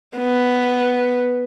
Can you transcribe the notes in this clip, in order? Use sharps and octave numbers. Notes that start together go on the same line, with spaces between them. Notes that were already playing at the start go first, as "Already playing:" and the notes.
B3